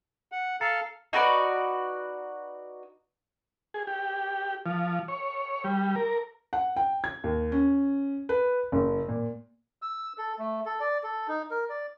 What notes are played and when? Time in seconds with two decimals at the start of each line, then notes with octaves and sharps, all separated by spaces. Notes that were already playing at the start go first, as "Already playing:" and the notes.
0.32 F#5
0.61 A4 F5 A#5 A6 C#7
1.13 D#4 F#4 B4 D5
3.74 G#4
3.87 G4
4.66 F3
5.08 C#5
5.64 G3
5.96 A#4
6.53 F#5
6.76 G5
7.04 G#6
7.24 D#2
7.52 C#4
8.29 B4
8.72 F#1
9.08 A#2
9.82 E6
10.18 A4
10.39 A3
10.66 A4
10.80 D5
11.04 A4
11.28 D#4
11.51 A#4
11.70 D5